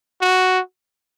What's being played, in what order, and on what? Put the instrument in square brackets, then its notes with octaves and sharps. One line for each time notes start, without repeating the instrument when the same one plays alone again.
[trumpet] F#4